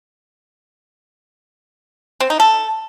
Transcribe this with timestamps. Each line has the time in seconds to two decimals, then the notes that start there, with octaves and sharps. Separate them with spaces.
2.20 C4
2.30 D#4
2.40 A4